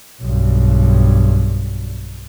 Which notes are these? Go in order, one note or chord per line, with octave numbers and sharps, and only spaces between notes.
B1 G2